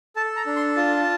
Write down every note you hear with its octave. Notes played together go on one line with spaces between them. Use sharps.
A4 A5
A#5
D4
C6
F4 A5